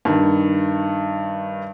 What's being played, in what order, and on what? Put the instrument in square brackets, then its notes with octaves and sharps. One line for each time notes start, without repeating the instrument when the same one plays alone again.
[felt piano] G2 D#3